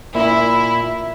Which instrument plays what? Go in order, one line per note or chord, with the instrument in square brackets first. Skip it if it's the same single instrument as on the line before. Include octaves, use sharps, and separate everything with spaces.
[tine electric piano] A#2 [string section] E4